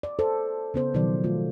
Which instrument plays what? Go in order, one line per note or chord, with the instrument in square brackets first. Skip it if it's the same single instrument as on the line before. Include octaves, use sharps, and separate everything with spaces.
[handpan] D5
A4 C5
C#3 B3 C5
B2 D#3 F3 F#3 D5
A3 F4